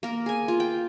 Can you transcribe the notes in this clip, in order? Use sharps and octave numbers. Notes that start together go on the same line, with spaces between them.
A#3 A#4
G#4 G#5
F4
G5